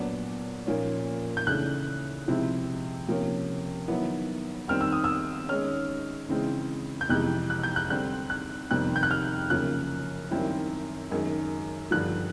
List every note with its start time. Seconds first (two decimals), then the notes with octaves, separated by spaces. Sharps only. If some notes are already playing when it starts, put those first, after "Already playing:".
Already playing: A#2 F#3 B3 D4
0.67 A#2 F3 A#3 C#4
1.37 G6
1.47 C#3 E3 A3 D4 F#6
2.28 C3 F3 G#3 C4 E4
3.08 C3 F3 A#3 C#4
3.88 D#3 F#3 B3 E4
4.68 D#3 G3 C4 F6
4.81 E6
4.92 D#6
5.04 E6
5.49 D#3 G#3 C#4 F6
6.29 C#3 E3 G#3 C4
7.01 G6
7.09 F2 C3 E3 G#3 F#6
7.50 F#6
7.63 G6
7.76 F#6
7.90 D3 G3 C4 F#6
8.30 F#6
8.70 F2 C3 D#3 G3 C4 F#6
8.96 G6
9.03 F#6
9.11 F6
9.50 F#2 C#3 F3 A#3 F#6
10.31 F#2 D#3 G3 C4 E4
11.11 F#2 D#3 G#3
11.91 G2 D3 F3 F#6